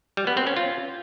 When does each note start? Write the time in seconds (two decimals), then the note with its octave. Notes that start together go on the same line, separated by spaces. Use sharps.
0.17 G3
0.27 B3
0.37 C4
0.47 C#4
0.57 F4